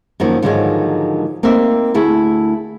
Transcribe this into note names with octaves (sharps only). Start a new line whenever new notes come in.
F#2 D#3 F3 A#3
G#2 D3 D#3 F3 F#3 G#3
A#3 C4 D#4 A#4 E5
D2 A3 E4 G#4